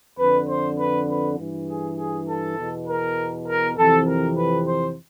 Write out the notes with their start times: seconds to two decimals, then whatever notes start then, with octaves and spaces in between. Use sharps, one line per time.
0.18 F2 D3 B4
0.48 C5
0.78 B4
1.07 B4
1.37 G2 E3
1.68 G#4
1.97 G#4
2.27 A4
2.57 E2 B2
2.87 A#4
3.47 A#4
3.77 F2 C3 E3 A4
4.07 A#4
4.36 B4
4.66 C5